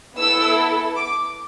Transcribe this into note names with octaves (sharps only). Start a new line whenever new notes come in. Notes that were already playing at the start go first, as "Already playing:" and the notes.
B3 E4 A4 E6
D6